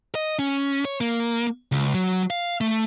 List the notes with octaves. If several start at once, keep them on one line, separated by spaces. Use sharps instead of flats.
D#5
C#4
C#5
A#3
C#2
F#3
F5
A3